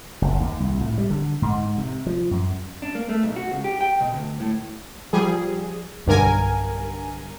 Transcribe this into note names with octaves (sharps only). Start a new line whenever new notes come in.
F#1
D#2
C2
A2
G3
D3
G#2
C3
F3
F#2
D4
A#3
A3
B1
F#4
C#2
G4
G5
B2
D2
A2
F3 G3 G#4
B1 G2 D3 A#4 G#5